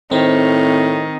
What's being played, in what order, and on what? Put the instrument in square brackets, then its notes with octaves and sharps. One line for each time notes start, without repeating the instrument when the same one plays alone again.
[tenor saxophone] A2 [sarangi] D#3 [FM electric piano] C4